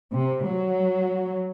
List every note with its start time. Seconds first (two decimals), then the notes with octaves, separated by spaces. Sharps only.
0.12 C3
0.47 F#3